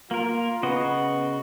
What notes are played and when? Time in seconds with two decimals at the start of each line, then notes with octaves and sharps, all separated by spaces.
0.11 A#3 F4 A#4
0.63 C#3 B3 F#4 D#5